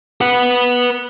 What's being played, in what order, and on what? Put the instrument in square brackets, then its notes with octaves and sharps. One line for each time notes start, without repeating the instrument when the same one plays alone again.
[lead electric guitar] B4 F#5